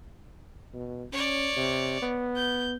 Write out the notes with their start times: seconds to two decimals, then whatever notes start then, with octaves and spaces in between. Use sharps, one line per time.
0.73 B2
1.13 C#4 C#5 D5
1.57 C3
2.02 B3
2.36 G6